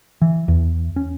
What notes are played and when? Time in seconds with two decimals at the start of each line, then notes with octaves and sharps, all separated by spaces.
0.22 E3
0.48 E2
0.96 C#4